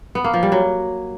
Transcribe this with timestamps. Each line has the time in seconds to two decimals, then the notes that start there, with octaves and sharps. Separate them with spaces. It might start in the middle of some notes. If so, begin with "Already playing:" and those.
0.15 B3
0.24 A#3
0.34 F3
0.43 G3
0.52 F#3